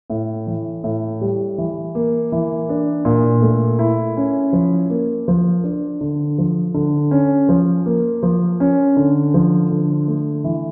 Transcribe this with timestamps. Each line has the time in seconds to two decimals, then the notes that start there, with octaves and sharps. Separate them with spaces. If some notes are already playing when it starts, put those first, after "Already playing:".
0.10 A2
0.47 E3
0.84 A2
1.21 G3
1.58 E3
1.95 A#3
2.32 E3
2.69 D4
3.05 A#2
3.42 A3
3.79 E4
4.17 C#4
4.53 F3
4.90 A#3
5.28 F3
5.64 D4
6.01 D3
6.38 F3
6.74 D3
7.11 C#4
7.49 F3
7.86 A#3
8.23 F3
8.60 C#4
8.97 D3
9.34 F3
9.70 D3
10.08 A3
10.44 E3